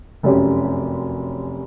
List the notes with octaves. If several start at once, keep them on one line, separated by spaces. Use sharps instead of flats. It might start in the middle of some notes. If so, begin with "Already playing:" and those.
F1 F#2 C#4 G4